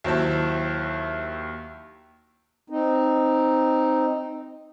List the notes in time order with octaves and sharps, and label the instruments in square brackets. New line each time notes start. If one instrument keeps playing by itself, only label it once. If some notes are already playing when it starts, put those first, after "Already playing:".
[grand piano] D#2 F#3 E4 C5 E5 A5
[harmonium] C4 D#4